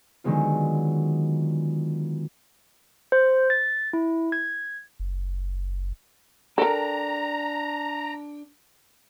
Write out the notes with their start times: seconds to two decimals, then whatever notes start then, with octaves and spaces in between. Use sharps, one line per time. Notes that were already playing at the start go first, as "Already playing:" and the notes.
0.24 D3 D#3 F#3 G#3 B3 F4
3.12 C5
3.50 A6
3.93 E4
4.32 G#6
5.00 F#1
6.58 D4 A4 A#4 G5 A#5